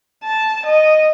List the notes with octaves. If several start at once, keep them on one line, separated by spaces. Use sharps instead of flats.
A5
D#5